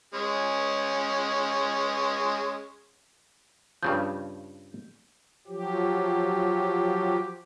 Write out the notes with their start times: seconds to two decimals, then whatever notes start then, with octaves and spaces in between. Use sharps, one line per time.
0.14 G#3 C#4
3.83 G2 C#3 F3 G6
5.47 F3 F#3 G4